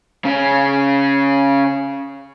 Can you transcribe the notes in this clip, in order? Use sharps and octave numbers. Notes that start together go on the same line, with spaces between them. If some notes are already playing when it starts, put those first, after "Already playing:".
C#3 C#4